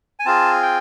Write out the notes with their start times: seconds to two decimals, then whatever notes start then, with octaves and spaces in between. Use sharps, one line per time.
0.20 G#5
0.26 C4 F4 G#4 A5
0.62 G5